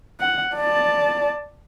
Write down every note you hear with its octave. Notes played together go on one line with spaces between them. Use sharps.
F#5
D5 A5